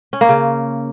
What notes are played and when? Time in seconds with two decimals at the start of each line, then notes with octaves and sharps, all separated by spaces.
0.13 C#4
0.21 A#3
0.29 C#3